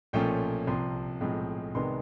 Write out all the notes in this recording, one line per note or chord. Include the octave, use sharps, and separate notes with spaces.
B1 A#2 F3 A3 C#4 G5
C2 C3 F3 C6
B1 A2 F3 G#3 C4
C2 C3 D#3 G#3 B3 C6